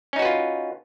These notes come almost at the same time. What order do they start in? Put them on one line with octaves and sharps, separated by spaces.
C#4 D#4 F#4 B4 F4